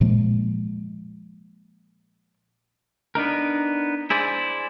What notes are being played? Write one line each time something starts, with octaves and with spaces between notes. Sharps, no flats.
A#2 F3 G#3 A#3
B3 D4 D#4 A#4
E4 G#4 C5 D5